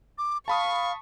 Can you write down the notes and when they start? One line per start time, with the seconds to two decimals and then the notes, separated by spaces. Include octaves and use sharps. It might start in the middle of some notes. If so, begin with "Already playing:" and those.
0.18 D6
0.48 F5 A5 B5 C#6 D#6